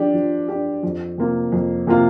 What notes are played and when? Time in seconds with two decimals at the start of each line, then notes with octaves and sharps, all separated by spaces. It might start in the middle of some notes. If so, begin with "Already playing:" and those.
Already playing: F3 D4 G4
0.14 F3
0.48 D4 G4
0.83 F2
1.18 C3 A#3 F4
1.52 F2
1.87 C3 A#3 F4